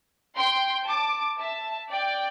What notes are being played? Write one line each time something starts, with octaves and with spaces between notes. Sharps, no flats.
G5 C6
A5 D6
E5 A5
D5 G5